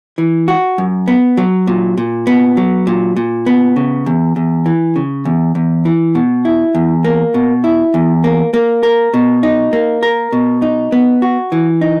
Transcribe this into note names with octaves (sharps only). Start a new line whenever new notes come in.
E3
F#4
F#2
B3
F#3
A#2
A#2
B3
F#3
A#2
A#2
B3
C#3
E2
E2
E3
C#3
E2
E2
E3
B2
E4
E2
A#3
B2
E4
E2
A#3
A#3
A#4
B2
D#4
A#3
A#4
B2
D#4
B3
F#4
E3
D#4